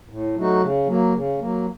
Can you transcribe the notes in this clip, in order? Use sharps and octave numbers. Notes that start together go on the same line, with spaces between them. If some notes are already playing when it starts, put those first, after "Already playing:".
A2
F#3 A3 D#4 F#4
C#3
F#3 A#3
C#3
F#3 A#3